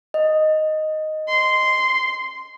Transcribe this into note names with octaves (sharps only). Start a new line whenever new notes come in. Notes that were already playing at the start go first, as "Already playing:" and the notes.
D#5
C6